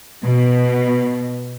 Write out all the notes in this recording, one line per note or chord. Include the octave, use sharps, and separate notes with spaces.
B2